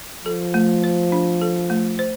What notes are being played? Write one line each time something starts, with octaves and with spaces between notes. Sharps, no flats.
F3 A4
A3
C5
D4
A4
A3
C5